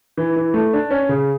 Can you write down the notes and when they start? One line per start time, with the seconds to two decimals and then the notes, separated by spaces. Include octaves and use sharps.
0.17 E3
0.36 E3
0.54 A3
0.73 D4
0.91 C#4
1.09 C#3